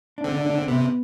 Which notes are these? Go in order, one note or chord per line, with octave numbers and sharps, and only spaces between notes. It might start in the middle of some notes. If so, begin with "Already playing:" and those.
D4
D3 C4
D4
D4
C4
C3 B3